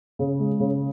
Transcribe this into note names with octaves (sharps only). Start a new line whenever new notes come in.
C#3
G#3
C#3